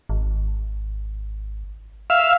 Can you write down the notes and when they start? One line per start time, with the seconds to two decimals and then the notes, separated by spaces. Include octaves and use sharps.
0.09 G#1
2.10 E5 F5